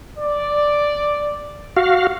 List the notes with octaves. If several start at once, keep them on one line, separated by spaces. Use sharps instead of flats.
D5
F#4 F5